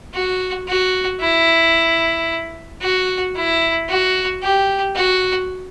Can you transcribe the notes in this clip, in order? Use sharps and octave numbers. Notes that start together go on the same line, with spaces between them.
F#4
F#4
E4
F#4
E4
F#4
G4
F#4